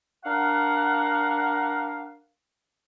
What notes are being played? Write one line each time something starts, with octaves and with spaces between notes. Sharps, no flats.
D4 A#4 F5 F#5